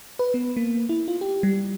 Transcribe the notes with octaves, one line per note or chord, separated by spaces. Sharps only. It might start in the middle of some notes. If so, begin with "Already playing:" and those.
B4
B3
A#3
E4
F4
G4
G3